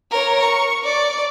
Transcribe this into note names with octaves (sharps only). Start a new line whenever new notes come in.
A#4 C#5
C#6
D5